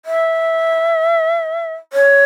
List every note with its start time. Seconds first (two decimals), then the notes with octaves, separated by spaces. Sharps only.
0.06 E5
1.93 C#5